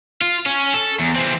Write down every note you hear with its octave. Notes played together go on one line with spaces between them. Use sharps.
F4
C#4
A4
E2
E3 C4